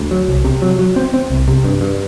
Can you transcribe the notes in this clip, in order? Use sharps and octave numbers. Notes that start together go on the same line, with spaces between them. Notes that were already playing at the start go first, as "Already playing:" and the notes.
Already playing: D2
F#3
C2
C3
F#3
F#3
C4
C4
C2
C3
G2
G2